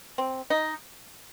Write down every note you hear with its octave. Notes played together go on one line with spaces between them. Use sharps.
C4
D#4